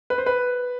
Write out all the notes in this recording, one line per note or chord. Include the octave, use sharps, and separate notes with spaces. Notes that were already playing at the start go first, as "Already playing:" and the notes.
B4
C5
B4